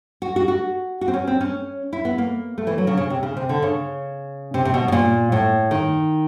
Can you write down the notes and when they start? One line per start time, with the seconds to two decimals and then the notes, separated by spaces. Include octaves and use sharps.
0.22 F#4
0.36 F#4
0.48 F#4
1.01 F#4
1.08 C4
1.14 C#4
1.27 C4
1.41 C#4
1.93 E4
2.05 B3
2.18 A#3
2.58 A3
2.67 E3
2.78 F#3
2.87 C#3
2.97 C#3
3.10 C3
3.23 C#3
3.37 C3
3.49 D3
3.62 C#3
4.54 C3
4.65 C3
4.74 B2
4.88 B2
4.92 A#2
5.32 A2
5.71 D#3